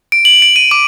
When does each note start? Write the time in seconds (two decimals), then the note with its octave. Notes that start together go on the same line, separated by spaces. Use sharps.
0.12 D7
0.25 F#7
0.42 D7
0.56 D#7
0.71 D6